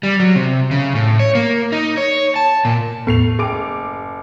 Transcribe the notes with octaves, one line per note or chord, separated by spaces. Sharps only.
G3
F#3
C3
C#3
A2
C#5
A#3
D#4
C#5
A5
A#2
E2 A2 A3 B3 C7 F7
F#1 G#4 A4 G5 D6 D7